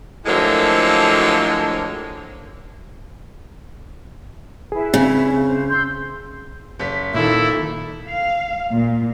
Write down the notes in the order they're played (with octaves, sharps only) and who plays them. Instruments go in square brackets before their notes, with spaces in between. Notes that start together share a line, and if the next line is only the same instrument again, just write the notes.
[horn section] A2 D3 F3 F#3 G#3 A#3
[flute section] E4 B4 [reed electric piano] G#4
[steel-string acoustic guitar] C#3 [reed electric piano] C4
[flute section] C5
C6 E6 G6
[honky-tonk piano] F#1 B6
[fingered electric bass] A#2 [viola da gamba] D#3 A4 [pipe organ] E4
[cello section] F5
A#2